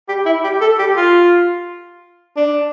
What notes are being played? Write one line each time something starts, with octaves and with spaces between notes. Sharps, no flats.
G4
E4
G4
A4
G4
F4
D4